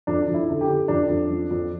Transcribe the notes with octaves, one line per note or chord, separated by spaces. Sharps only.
F2 D4
F2
E4
D3
G4
D3
F2 D4
F2
F3
F2